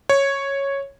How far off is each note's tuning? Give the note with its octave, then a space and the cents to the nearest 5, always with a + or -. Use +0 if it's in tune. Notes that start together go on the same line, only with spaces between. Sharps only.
C#5 -5